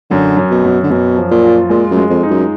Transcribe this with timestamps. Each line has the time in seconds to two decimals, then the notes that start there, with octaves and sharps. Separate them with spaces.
0.10 F#2 D3
0.37 F#2
0.50 B2
0.64 F#2
0.83 D3
0.90 F#2 B2
1.17 F3
1.31 A#2
1.44 F4
1.69 A#2 G#3
1.90 F#2
1.97 G#3
2.10 F2
2.23 D#4
2.30 F#2